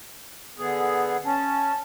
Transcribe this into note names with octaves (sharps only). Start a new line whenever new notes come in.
D3 B3 G#4
C#4 A5